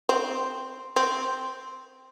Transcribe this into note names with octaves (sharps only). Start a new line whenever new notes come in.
C4
C4